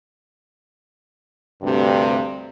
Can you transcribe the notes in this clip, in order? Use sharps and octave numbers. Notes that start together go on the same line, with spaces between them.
D2 G2 C3